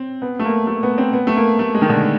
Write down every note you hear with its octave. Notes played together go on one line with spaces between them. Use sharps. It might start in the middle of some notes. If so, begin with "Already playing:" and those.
Already playing: C4
B3
A3
A#3
A3
B3
C4
B3
A3
A#3
A3
G#3
D#3
D3